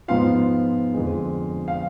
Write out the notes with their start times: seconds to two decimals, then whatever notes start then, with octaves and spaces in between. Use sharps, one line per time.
0.08 G#2 F3 B3 F4 F5
0.94 F2 D3 G#3
1.68 F5